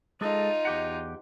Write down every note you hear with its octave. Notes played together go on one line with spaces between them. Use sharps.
G#3 D#4 F4 G#4 A4 D#5
E2 G4 F#5